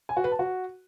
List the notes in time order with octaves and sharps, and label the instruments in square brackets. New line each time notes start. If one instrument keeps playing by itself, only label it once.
[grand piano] G#5
F#4
B4
A5
F#4